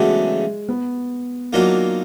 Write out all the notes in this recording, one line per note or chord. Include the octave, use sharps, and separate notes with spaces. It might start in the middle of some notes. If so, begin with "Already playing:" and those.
Already playing: E2 C#3 F#3 G#3 A3 D4
B3
D#3 F#3 A#3 D4 F4